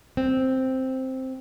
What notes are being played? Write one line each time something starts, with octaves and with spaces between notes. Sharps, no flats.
C4